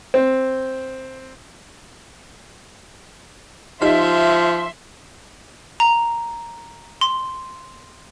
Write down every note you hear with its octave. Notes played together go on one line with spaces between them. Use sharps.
C4
F3 D#4 G4 D#5 E5 C6
A#5
C6